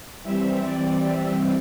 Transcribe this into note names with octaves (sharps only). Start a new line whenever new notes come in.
E3 G3 C4 E5
D5
E5